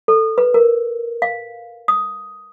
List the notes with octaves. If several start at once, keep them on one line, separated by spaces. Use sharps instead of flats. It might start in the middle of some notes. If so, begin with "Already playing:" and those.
A4
B4
A#4
F5
D#6